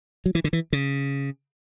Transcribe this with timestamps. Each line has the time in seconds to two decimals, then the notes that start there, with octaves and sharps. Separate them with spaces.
0.26 F#3
0.35 E3
0.44 D3
0.53 E3
0.73 C#3